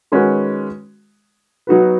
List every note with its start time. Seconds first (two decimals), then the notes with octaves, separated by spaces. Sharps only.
0.12 D#3 G#3 C#4 F#4 B4
1.67 F#3 B3 D#4 F#4 B4